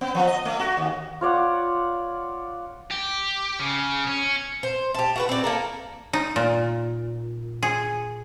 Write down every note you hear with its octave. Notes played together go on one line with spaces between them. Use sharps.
B3
F3
D#5
A3
F#4
D#2
F4 C#5 D5 F#5
G4
C#3
C#4
C5
G4 A5
F#4 A#4 B4
C4 D5
A#3 A4 A#4
D#4
A#2
G#4